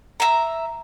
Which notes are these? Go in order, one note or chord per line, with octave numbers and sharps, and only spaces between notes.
E5 A#5